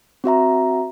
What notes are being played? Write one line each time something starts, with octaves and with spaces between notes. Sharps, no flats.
C4 F#4 E5 A#5